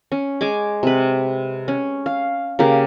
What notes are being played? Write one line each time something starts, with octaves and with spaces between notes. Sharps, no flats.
C#4
G#3 G#5 D6
C3 B4
C#4
F5
C#3 A#3 G4